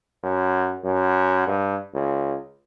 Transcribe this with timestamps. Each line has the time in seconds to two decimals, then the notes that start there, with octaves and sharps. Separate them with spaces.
0.24 F#2
0.84 F#2
1.47 G2
1.94 C#2